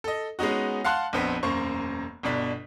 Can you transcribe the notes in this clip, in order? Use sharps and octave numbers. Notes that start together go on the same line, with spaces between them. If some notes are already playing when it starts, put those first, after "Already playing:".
A4 D#5
G#3 B3 C#4 D#4 F#4
F5 F#5 A5 C6 F#6
A#1 F2 B3 C4 B6
E1 F#2 A#3 C5 C#6
G1 B2 D4 B6